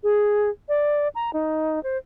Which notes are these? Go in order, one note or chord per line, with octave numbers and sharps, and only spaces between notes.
G#4
D5
A#5
D#4
C5